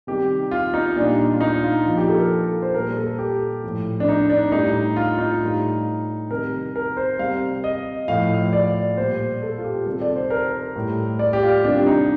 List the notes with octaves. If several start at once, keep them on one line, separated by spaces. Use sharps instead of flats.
C3 D#3 G3 G4
F4
D#4
A#2 G3 D4
F4
D#4
F4
A#2 F3 F4
G4
A4
A#4
C5
A#2 G3 A#4
A4
G4
A2 F3
D4
D#4
D4
A2 G3 D#4
F4
D#4
A2 G3
C3 D#3 G3 A#4
A#4
C5
C3 G3 F5
D#5
A2 F3 F5
D5
A#2 G3 C5
A4
F4
G4
C3 D#3 G3 A4
D5
C5
A#4
A2 G3
D5
G4
F4
C3 D#3 G3 D4
D#4